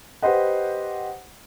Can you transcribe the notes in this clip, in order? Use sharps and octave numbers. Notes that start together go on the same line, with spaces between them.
G4 B4 C5 D#5 F#5